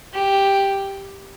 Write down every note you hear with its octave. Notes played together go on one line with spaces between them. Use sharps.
G4